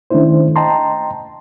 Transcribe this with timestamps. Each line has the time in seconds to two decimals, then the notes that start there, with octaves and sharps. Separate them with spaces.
0.10 D#3 A3 C#4 D4 E4 C5
0.56 D#5 G5 A5 A#5 C6